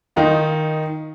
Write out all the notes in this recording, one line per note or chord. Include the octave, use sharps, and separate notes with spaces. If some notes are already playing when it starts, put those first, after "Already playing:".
D#3 D#4 F4